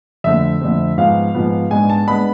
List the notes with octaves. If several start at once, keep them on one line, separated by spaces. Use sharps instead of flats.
F2 D3 A3 C4 E5
F2 D3 A3 C4
G#2 F3 B3 F5
G#2 F3 B3
G#2 G#3 B3 D4 G#5
A5
G#3 B3 D4 B5